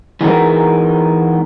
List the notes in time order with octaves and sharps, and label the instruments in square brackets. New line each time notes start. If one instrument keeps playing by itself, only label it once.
[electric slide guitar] E3 G#3 B3 D#4 F#4 A#4